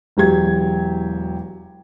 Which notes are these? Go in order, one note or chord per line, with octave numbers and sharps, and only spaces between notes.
E1 F#3 G4 G#6